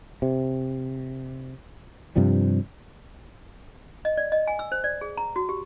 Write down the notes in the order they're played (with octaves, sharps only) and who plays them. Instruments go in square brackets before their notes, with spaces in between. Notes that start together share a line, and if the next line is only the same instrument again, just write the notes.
[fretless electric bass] C3
G2 C3 F3 G3
[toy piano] D#5
D5
D#5
G#5
E6
C5
D5
G#4
A#5
F#4
G4